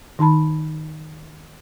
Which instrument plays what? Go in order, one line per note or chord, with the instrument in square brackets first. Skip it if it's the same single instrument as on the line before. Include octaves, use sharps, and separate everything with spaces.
[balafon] D#3 D#4 A5 B5